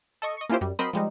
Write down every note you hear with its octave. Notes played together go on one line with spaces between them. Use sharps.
A4 D#5 C#6
D#5 C#6
A#3 C#4 E4 F4 G4 C5
F#2 G3
F#3 C4 A#4 C5 D#5 B5
F3 G3 G#3 D#4